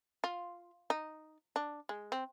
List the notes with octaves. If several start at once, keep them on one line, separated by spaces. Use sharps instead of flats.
F4
D#4
D4
G#3
C4